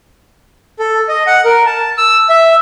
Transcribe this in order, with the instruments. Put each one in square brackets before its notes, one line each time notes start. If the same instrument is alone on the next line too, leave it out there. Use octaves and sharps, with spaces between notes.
[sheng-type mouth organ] A4
D#5
F#5
A#4
A5
E6
E5